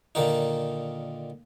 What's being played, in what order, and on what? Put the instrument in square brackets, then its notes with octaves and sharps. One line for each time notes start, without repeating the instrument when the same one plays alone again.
[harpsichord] A#2 D3 D#3 D#4